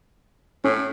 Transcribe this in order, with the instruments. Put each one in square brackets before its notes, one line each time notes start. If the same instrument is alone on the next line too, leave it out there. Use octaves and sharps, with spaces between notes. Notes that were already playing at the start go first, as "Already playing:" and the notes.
[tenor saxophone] A2 [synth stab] C#4